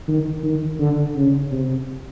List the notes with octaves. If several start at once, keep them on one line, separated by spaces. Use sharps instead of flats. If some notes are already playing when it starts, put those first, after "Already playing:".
D#3
D#3
D3
C#3
C3